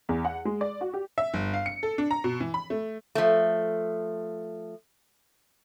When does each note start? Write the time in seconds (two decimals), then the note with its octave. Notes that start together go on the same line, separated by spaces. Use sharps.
0.09 E2
0.25 F#5
0.45 G#3
0.61 D5
0.81 F#4
0.94 G4
1.18 E5
1.34 G1
1.54 F5
1.66 C#7
1.83 A4
1.98 D4
2.11 A#5
2.24 B2
2.40 E3
2.54 B5
2.70 A3
3.15 F3 A3